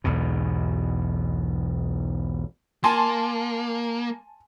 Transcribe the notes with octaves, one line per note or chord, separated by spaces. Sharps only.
B1 E2 G#2 B2
A#3 G#5 A5 C6